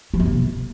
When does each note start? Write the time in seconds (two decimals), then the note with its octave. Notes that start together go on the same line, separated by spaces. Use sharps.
0.14 F3
0.19 F2
0.25 C3